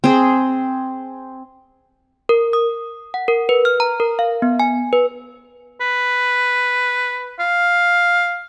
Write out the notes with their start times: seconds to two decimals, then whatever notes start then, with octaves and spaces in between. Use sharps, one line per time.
0.04 C4 G#4
2.29 A#4
2.53 D#6
3.14 F#5
3.28 A#4
3.49 B4
3.65 F6
3.80 A#5
4.00 A#4
4.19 F5
4.42 B3
4.60 G#5
4.93 B4
5.81 B4
7.40 F5